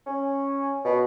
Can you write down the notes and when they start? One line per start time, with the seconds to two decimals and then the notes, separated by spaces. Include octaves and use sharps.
0.07 C#4
0.85 B2